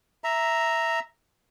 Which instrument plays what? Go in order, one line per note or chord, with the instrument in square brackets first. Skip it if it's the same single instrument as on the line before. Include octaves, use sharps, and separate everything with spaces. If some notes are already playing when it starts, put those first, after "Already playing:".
[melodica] E5 A#5